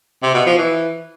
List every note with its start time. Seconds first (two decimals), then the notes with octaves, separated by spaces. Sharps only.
0.23 C3
0.34 B2
0.46 F3
0.58 E3